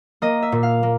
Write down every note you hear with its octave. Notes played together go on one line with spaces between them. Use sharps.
A#3 D#5
E5
A#2
F5
A#3